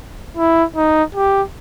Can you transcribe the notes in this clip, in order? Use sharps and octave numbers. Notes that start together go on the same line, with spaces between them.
E4
D#4
G4